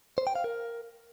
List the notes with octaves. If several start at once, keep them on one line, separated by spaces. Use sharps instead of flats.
C5
G5
F5
A#4